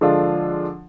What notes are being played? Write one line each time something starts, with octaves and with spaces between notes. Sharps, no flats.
D3 F3 G#3 D4 F4